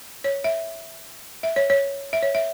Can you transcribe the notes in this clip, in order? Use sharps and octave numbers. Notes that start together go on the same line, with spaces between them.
C#5
E5
E5
C#5
C#5
E5
C#5
E5